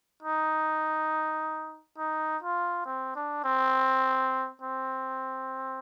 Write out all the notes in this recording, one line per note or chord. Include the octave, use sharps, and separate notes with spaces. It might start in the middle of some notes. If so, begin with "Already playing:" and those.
D#4
D#4
F4
C4
D4
C4
C4